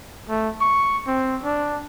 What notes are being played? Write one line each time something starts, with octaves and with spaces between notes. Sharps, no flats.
A3
C#6
C4
D4